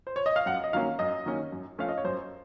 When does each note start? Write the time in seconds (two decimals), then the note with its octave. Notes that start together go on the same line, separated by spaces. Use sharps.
0.07 C5
0.16 C#5
0.26 D#5
0.36 F5
0.46 F#2 F#5
0.64 D#5
0.73 D#3 F#3 A#3 C#4 F5
0.99 F#2 D#5
1.26 D#3 F#3 A#3 C#4
1.52 F#2
1.78 F3 A3 C#4 F5
1.89 D#5
1.98 C#5
2.05 F#2 C5